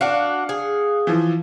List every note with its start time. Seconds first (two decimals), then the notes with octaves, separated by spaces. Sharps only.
0.01 D4 F#4 F5 F#5
0.49 G#4
1.07 E3 F3